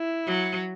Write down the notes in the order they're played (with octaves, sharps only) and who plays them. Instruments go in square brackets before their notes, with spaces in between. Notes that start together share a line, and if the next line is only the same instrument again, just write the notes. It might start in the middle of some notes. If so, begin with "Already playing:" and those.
Already playing: [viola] E4
[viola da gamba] F#3